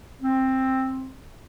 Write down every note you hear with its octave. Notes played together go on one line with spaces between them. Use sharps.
C4